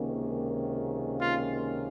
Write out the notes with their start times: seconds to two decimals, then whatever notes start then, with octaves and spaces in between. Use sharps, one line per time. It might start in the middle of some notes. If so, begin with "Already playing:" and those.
Already playing: C#2 C3 D#3 A#3 C#4
1.19 F4